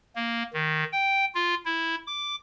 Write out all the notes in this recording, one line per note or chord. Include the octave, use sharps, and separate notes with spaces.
A#3
D#3
G5
F4
E4
D6